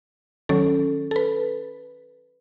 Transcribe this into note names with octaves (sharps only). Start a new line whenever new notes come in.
D#3 F#3 C#4 A4
A4
B4